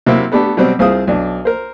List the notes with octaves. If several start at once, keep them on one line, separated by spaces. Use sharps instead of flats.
C3 F#3 A#3 C4 E4
A3 B3 D4 G4 A4
B2 F#3 G3 C4
C2 C4 F4 G#4 C5 D#6
B1 D4
A#4 C5